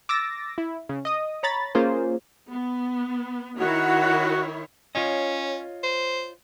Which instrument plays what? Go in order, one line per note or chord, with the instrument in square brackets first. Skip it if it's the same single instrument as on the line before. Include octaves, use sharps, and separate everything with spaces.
[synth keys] D6 E6 A6 A#6
E4
C#3
D#5 D#6
C#5 A#5 B5 A6
A#3 C#4 F4 G#4 C5
[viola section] B3
[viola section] D#3 E4 C#5 [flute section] F#4
[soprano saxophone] C#4 [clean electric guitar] F4 C#5 D#5
[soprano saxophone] C5